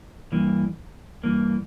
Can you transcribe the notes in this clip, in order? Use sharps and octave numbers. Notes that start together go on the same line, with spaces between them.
G2 E3 A#3
G2 E3 A#3